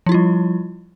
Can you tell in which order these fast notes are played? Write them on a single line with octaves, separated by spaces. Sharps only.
F3 E4 F4 G3